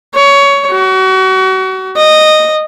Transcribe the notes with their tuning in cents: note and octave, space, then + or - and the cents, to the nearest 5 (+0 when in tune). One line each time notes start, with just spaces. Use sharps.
C#5 +15
F#4 +35
D#5 -10